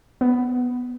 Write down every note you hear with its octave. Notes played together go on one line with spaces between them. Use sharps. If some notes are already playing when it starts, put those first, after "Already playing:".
B3